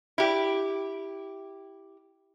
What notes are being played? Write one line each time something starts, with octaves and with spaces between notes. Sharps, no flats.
E4 G4